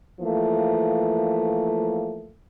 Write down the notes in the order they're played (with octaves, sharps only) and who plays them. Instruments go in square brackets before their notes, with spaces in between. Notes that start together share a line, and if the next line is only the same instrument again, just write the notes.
[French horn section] E3 F3 A3 A#3